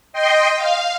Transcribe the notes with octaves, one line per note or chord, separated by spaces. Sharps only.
D#5 G5 C6
F5